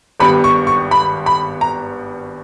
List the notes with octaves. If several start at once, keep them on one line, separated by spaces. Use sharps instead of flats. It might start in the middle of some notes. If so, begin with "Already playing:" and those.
G#1 G2 G3 B3 B5
C#6
C#6
B5
B5
A#5